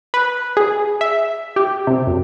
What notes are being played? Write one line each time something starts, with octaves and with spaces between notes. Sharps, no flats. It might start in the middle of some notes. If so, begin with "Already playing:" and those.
B4
G#4
E5
G4
C3
F#2